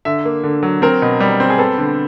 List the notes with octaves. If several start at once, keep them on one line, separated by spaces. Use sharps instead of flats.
D3 E5
A#3
D3
F#3
C4 A#4
B2
G3
C4
G#4
B3 A4
D3